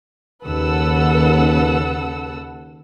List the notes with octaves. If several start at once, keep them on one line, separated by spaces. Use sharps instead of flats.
D#2 C#3 A4 B4 F#5 E6